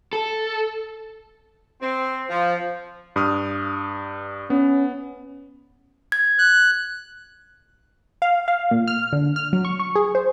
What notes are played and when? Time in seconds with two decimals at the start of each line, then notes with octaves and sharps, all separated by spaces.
0.13 A4
1.82 C4
2.29 F3
3.16 G2 D#6 F6
4.50 B3 C#4
6.12 G#6
6.39 F#6
8.22 F5
8.48 F5
8.71 A#2
8.88 F6
9.13 D3
9.36 F6
9.53 F#3
9.65 C#6
9.80 C#6
9.96 G#4
10.15 C5